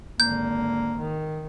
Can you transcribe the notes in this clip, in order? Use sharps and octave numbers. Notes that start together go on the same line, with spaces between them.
G#1 D3 A#3 G6
D#3